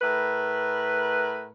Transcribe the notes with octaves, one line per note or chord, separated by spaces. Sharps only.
A2 A#4 B4